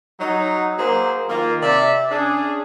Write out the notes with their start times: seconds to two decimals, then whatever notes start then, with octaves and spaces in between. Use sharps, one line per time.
0.20 F#3 D#4
0.79 F#3 A#3 G#4 C5
1.30 D#3 A#3 F4
1.62 C3 D5 E5
2.12 C#4 D4 G#4